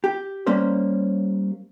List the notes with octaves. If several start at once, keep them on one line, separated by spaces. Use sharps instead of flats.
G4
G3 A#3 C#4 C5